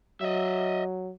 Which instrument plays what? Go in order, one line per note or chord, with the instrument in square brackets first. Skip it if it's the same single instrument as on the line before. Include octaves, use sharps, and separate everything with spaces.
[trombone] F#3 [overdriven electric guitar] D#5 E5